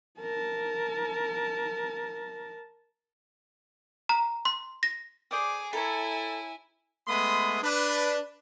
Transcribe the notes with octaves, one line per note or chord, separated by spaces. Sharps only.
A#4 A5
A#5
C6
A#6
G#4 C5 D5 D6 D#6
E4 A4 C#5 G#5 A#5 B5
G#3 A3 B3 B5 C6 D#6
D4 B4